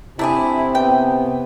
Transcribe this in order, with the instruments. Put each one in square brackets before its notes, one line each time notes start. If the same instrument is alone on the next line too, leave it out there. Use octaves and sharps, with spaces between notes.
[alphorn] C3 [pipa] A3 D4 G#4 [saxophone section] E4
[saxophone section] B3 [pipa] G5